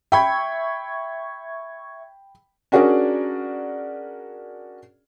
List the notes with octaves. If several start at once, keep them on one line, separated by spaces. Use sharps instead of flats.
E5 G5 B5 C#6 G#6
C#4 D4 F#4 G#4 A#4 D5